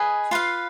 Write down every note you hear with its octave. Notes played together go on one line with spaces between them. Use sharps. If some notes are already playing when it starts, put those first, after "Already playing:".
Already playing: G#4 B4 D#5 G#5
F4 B4 F5